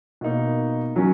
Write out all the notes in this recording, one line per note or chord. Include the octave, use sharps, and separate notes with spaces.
B2 A#3 D#4
D#3 F#3 C#4 F#4